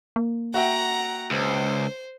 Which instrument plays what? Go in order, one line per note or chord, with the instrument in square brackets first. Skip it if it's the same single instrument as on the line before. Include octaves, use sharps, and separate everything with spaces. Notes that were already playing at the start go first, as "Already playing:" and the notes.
[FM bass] A#3
[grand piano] F#4 E5 G5 [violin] F#5 A#5
[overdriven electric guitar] C#2 [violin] C5